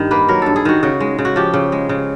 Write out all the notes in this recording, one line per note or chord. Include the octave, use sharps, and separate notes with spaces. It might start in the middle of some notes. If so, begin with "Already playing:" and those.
Already playing: G2 D#3
A#3 B4
F#3 A#4
G2 A4
G#4
D#3 F#4
C#3 F#4
G#3
C#3
F#4
F3 G4
C#3
G#3
C#3